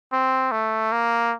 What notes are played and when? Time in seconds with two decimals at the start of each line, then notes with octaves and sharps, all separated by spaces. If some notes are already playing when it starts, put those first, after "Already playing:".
0.12 C4
0.51 A3
0.92 A#3